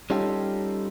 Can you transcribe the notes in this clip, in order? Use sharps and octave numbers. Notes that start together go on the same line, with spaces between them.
G3 C#4 D#4 F4 G4 A4